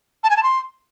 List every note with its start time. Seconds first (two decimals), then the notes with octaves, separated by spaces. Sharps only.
0.24 A5
0.30 G#5
0.37 A5
0.43 C6